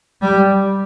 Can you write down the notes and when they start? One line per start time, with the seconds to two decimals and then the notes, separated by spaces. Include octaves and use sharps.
0.22 G3